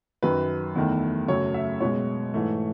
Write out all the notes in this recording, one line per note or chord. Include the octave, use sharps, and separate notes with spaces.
F#2 D#3 F#3 B4
E2 D#3 A3
F#2 C#3 F#3 A3 C#5
E5
B2 G#3 C#5
G#2 E3 A3